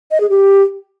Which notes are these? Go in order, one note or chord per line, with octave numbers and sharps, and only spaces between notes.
D#5
G#4
G4